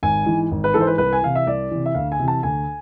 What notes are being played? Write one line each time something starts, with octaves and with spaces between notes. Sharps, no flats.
G#1 G#5
G#2 E3
G#1
B4
G#2 E3 A4
C5
B4
C2 B4
G#5
C3 E3 F5
E5
C2 D5
C3 E3
E5
D2 F5
G#5
C3 E3
A5
D2 G#5